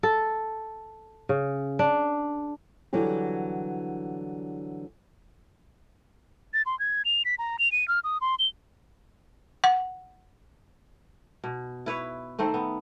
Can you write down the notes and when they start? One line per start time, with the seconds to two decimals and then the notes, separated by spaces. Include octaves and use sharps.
0.03 A4
1.29 C#3
1.79 D4
2.93 D3 E3 F#3 G3 G4
6.54 A6
6.66 C6
6.79 G#6
7.05 F7
7.25 B6
7.39 A#5
7.59 F7
7.72 D#7
7.88 F6
8.04 D#6
8.21 C6
8.39 G7
9.64 F#5
11.44 B2
11.86 E4 B4 C#5
12.39 D#3 A3 C4 C5
12.54 B3